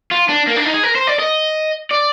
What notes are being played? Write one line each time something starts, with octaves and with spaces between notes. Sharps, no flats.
F4
D4
A#3
D4
D#4
G#4
A#4
C5
D5
D#5
D5